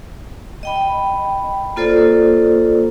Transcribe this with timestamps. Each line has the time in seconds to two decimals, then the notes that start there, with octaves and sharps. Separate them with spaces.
0.63 D#5 G5 B5
1.76 A#3 F4 A4 C5 D5